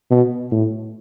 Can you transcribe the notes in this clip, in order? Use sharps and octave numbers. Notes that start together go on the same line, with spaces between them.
B2
A2